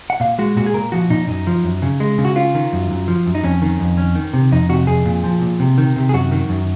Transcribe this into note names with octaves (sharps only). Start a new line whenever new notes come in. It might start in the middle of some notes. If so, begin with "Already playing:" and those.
F#5
A#2 F5
G#3 F#4
A#2 F#4
G#4
A#2 A#4
F3 F#4
A#2 D#4
F#2 D#4
F3
F#2
C#3
G#3
C#3
F#4
C#4 F4
D#3
F#2
F#2
F3
F#2
D#4
F2 C#4
D#3
F2
C#4
D#3
C3
F2 D#4
C3 F#4
F2 G#4
A#2
F3
A#2
C3
D#3
C3
G#4
F#2 F#4
D#3
F#2